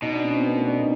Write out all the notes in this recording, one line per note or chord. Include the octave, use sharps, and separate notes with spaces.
B2 D#4
D4
C#4
C4
B3
A#3
D4
D#4